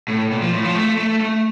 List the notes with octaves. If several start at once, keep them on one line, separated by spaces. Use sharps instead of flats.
A2
A#2
F3
A2
F3
A3
A3
A3